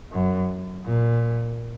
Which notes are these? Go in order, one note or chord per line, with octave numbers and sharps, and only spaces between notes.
F#2
A#2